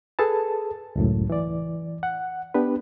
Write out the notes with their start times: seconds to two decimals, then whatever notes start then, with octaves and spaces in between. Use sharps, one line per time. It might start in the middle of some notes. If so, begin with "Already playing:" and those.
0.19 G#4 A4 B4 A5
0.96 C#2 F#2 A2
1.30 E3 D5
2.03 F#5
2.54 B3 D4 G4 B4